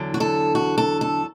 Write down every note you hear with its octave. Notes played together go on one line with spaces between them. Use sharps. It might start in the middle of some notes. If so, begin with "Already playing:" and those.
Already playing: E2 D3 F#3
F#4
A4
F#4
A4
A4